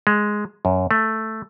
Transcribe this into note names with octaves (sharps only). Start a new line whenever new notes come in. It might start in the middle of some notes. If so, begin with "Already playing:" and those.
G#3
F#2
A3